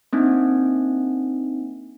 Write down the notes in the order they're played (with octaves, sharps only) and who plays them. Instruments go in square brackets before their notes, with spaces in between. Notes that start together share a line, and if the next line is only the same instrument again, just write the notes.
[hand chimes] A#3 C4 D4 D#4